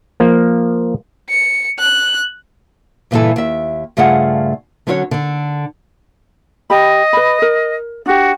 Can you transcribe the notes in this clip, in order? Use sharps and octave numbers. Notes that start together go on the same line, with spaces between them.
F3 A#3
C#7
F#6
G2 A#2 C#3 E3 E4 A4
D#2 E5
G2 C#3 A3 F4 G#4 F#5
D3 F#3 C#4 E4 F#4 C#5
D3 A4
G4 D#5 B5
B4 B5
A#4
D4 F#4 G4